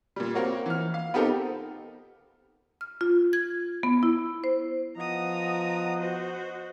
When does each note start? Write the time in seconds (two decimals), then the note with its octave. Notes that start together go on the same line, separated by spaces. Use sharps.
0.16 A#2 G3
0.35 A#3 C4 F#4 A#4 C#5
0.66 E3 F6
0.94 F5
1.14 B3 C4 D#4 G4 A4 A#4
2.81 F6
3.01 F4
3.33 G#6
3.83 B3
4.03 E4
4.44 C5
4.97 F3 B3 D#5 F#5 A#5 D#6
5.99 F#4 C5